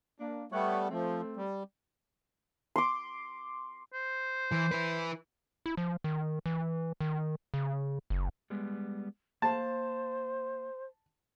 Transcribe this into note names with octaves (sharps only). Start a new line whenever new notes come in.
A#3 D4
G3 A3 B3 C#5 F#5 G5
F3 A3 C4
G3
C6 D6
C5
E3
E4 B4
E4
F3
D#3
E3
D#3
C#3
F#1
G3 G#3 B3
A#3 C5 F5 A5